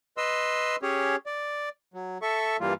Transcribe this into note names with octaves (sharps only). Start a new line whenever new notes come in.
B4 D#5 C6 E6
C#4 G4 G#4 C#5
D5
F#3
A4 E5 C#6
G2 E3 G3 A#3 F4